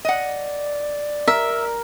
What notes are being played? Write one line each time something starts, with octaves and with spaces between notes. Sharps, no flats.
D5 D#5 F#5
A#4 E5